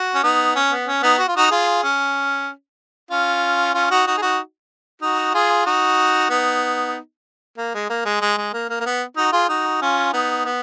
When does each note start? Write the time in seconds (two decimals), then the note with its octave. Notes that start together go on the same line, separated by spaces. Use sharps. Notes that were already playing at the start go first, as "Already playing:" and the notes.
Already playing: F#4
0.15 C#4
0.23 B3 D#4
0.56 C#4
0.71 B3
0.87 C#4
1.03 B3 D#4
1.19 F#4
1.28 F4
1.36 D#4 F#4
1.51 F4 G#4
1.83 C#4
3.11 C#4 F4
3.74 C#4 F4
3.91 D#4 F#4
4.07 D#4 F#4
4.17 G#4
4.22 D#4 F#4
5.02 D#4 F#4
5.34 F4 G#4
5.66 D#4 F#4
6.29 B3 D#4
7.58 A#3
7.74 G#3
7.89 A#3
8.05 G#3
8.21 G#3
8.37 G#3
8.53 A#3
8.69 A#3
8.80 A#3
8.86 B3
9.17 D#4 F#4
9.33 F4 G#4
9.49 D#4 F#4
9.81 C#4 F4
10.13 B3 D#4
10.45 B3